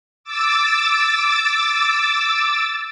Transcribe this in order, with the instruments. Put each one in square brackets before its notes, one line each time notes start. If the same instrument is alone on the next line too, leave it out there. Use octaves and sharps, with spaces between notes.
[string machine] D6 E6 A6